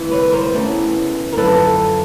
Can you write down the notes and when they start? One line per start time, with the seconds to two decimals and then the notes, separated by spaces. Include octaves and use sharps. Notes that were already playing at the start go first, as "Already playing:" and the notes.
Already playing: D2 C3 E3 G3
0.11 B4 C#5
0.23 B4
0.32 A#4 C5
0.54 E2 C#3 E3 A3 C#4
1.33 A#4
1.37 F#2 D3 F3 A4 B4